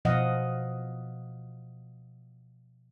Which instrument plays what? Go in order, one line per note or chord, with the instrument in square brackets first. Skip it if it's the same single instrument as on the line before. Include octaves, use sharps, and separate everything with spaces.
[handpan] B2 F3 D#5 F5 F#5